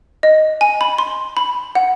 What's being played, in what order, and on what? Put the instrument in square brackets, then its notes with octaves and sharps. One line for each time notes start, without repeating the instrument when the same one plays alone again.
[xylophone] D#5
G#5
B5
C6
B5
F#5